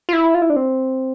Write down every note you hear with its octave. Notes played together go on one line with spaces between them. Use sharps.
F4
E4
F4
E4
D4
C4